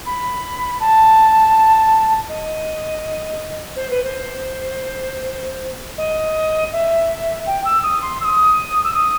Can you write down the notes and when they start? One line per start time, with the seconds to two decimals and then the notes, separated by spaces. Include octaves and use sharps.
0.06 B5
0.80 A5
2.28 D#5
3.76 C5
3.90 B4
4.04 C5
5.97 D#5
6.72 E5
7.46 G5
7.65 E6
7.83 D#6
8.02 C6
8.21 E6
8.24 D#6
8.84 E6
8.94 D#6